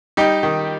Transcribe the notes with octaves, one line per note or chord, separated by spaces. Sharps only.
G3 D#4 G4
D#3